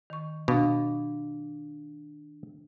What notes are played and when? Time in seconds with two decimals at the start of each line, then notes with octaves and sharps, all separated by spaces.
0.10 D#3 C#6
0.48 B2 D4 F5